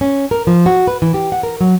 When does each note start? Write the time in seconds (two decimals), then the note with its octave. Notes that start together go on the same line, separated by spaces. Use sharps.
0.01 C#4
0.31 A#4
0.47 F3
0.66 F#4
0.87 B4
1.02 E3
1.14 G4
1.32 F#5
1.43 A#4
1.61 F#3